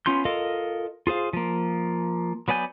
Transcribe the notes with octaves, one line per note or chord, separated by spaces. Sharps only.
B3 C#4 F4 C6 G6
F4 A4 A#4 D#5 F5
F4 G#4 C5 F5
F3 A#3
F#3 B3 D5 G#5 G6